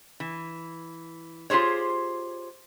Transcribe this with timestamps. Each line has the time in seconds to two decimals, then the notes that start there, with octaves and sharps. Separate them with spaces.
0.20 E3
1.50 F4 G4 G#4 C5 C#5